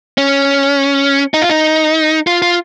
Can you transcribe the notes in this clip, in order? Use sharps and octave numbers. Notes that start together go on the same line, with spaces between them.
C#4
D#4
F4
D#4
F4
F4